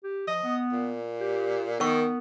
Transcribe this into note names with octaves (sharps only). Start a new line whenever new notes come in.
G4
F3 D#5
B3
A#2
G4
D#3 B3 A#4 C#6